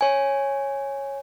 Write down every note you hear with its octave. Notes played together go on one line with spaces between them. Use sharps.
C#5 G#5